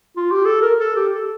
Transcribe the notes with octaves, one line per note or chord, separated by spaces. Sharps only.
F4
G4
A4
A#4
A4
G4
A4